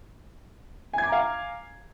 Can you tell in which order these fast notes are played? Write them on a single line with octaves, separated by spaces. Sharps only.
G#5 G#6 D6 A#5 F5